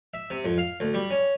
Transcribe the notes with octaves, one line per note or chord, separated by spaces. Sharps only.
E5
C3
F2
F5
D2
G3
C#4